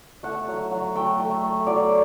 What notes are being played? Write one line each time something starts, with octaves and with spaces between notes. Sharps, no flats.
A3 F#5
F#3
F#3
A3 G5
A3
A3
F#3 D5